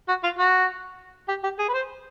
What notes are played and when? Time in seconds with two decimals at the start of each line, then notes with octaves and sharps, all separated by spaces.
0.08 F#4
0.23 F4
0.38 F#4
1.28 G4
1.43 G4
1.59 G#4
1.68 B4
1.74 C5